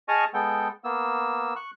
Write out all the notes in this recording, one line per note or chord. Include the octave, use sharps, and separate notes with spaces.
G#4 D#5 G#5 A5 C#6 F6
G#3 B3 A4 G5
A#3 B3 E6
C#6 F#6